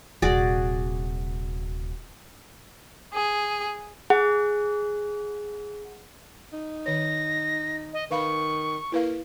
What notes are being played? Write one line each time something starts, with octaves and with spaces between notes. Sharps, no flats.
D#1 C3 F#4 G#4 D5
G#4
G#4 F#5
D#4
D#3 C#5 A#6
D#5
D#3 B4 F5 B5 C#6
A#3 E4 B4 F5